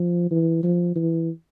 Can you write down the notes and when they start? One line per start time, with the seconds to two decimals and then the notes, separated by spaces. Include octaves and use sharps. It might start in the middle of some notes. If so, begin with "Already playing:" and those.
Already playing: F3
0.31 E3
0.63 F3
0.95 E3